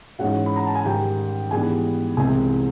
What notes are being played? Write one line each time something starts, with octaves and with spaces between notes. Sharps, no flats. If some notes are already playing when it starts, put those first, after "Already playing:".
G#2 E3 G#3 C#4 F#4 F#5
B5
A#5
A5
G#5
G#2 D#3 G3 G4 G5
G#2 E3 G3 B3 D4 G#4 G#5
C2 C3 E3 G#3 C4 G#4 G#5